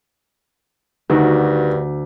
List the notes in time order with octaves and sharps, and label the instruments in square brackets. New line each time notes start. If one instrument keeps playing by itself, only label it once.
[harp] D2 [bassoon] G2 [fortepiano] D#3 F#4